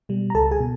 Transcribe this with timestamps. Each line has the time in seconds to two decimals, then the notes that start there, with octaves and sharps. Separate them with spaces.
0.09 B2 G3
0.30 A#5
0.34 C#2 A4 A5
0.51 G#4 G#5
0.60 B2